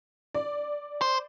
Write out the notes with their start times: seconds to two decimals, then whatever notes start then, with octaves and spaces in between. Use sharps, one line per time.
0.34 D5
1.01 C5